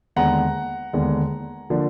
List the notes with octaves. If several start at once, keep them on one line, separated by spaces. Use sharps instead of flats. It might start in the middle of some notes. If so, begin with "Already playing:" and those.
D#2 D3 G#3 B3 D4 F#5 A#5
D#2 D3 G#3 B3 D4
D3 F3 A#3 D4